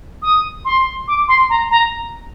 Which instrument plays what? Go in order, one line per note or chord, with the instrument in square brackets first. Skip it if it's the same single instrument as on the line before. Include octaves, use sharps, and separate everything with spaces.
[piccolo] D#6
C6
D6
C6
A#5
A#5